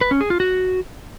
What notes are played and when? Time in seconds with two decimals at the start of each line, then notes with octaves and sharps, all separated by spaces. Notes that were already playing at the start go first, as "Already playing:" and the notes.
0.01 B4
0.11 C#4
0.21 G#4
0.30 F4
0.40 F#4